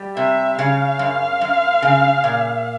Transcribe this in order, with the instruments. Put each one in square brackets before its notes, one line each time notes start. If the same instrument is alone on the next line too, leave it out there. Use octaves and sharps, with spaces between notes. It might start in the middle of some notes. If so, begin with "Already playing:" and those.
Already playing: [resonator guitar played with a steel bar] G3
[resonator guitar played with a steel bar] C3 [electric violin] E5
[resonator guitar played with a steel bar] C#3 [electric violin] F5
[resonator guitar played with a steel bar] F#2
F#2
C#3
A#2